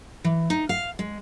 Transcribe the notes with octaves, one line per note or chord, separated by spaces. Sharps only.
E3
D#4
F5
G#3